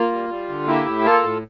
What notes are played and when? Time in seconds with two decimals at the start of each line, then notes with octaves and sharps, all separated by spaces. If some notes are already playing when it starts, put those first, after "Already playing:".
Already playing: A#3 F4
0.12 G3
0.30 G3
0.49 D3
0.67 A#3 E4 G4
0.86 A2
1.04 A#3 F4 A4
1.23 A2